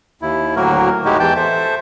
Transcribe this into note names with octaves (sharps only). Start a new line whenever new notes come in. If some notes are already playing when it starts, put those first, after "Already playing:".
D#2 E4
D2 A2 F#3 A#3 F#4 A#4
A2 G#3 D#4 E4 F#4 G4
E2 E3 G5 A5 G6
A4 C5 E5